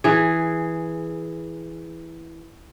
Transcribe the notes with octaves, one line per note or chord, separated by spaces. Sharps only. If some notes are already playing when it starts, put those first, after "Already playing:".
E3 G#4